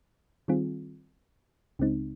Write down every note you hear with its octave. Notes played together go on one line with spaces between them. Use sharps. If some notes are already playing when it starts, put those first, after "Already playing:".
D#3 G3 C4 F4 G#4
C#2 C#3 G#3 C4 D#4